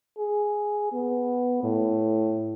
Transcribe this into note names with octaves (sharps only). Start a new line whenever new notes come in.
G#4
B3
A2